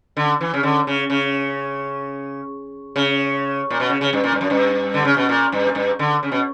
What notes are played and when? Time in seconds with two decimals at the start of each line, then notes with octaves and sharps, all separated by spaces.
0.17 D3
0.41 E3
0.54 C#3
0.63 D3
0.87 C#3
1.10 C#3
2.96 C#3
3.70 A#2
3.80 B2
3.90 C#3
4.01 C#3
4.13 G2
4.24 A#2
4.32 G2
4.41 F#2
4.50 G2
4.94 D3
5.05 C#3
5.17 B2
5.29 A#2
5.52 G2
5.67 A#2
5.75 G2
5.99 D3
6.23 C#3
6.32 B2